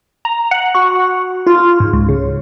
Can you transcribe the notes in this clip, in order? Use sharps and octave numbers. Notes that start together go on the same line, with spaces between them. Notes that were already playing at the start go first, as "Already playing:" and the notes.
A#5
F#5
F#4
F4
G#2
C#2
C#3